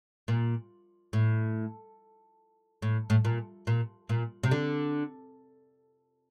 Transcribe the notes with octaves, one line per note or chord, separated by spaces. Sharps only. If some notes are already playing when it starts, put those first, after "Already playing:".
A#2
A2
A2
A2
A#2
A#2
A#2
C3
D3